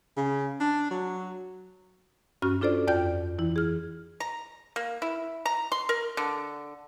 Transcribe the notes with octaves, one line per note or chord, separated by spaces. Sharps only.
C#3
D4
F#3
G2 C#4 F#4 F6
D4 F4 A4 C5 D5
F2 F4 D5 G5 G6
E3 E4
G#4 F6
A#5
A#3
E4
A#5
C6
A#4
D3